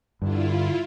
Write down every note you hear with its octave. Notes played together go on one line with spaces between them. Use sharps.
G2 D3 E4 F4